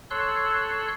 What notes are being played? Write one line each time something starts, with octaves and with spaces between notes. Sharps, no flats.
A4 C#5 C6 E6 F#6